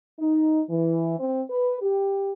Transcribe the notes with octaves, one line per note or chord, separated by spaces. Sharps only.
D#4
E3
C4
B4
G4